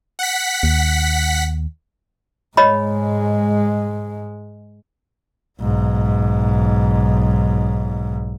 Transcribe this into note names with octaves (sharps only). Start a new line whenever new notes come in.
F#5 B6
D#2
G#2 G#3 C#5 D#5 B5
B1 G#2